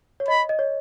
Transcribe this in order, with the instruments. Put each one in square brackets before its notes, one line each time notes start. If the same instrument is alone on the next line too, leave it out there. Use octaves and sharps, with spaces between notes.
[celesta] C#5
[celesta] D#5 [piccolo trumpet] B5
[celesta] D#5
C#5